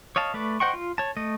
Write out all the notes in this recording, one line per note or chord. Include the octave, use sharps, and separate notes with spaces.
C#5 D#5 F5 A5
A3 B4 D5
C5 D#5 F#5 G5 C#6
F4
C#5 A5
A3 D#5